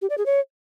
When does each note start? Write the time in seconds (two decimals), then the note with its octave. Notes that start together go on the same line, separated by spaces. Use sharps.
0.02 G4
0.10 D5
0.18 G#4
0.26 C#5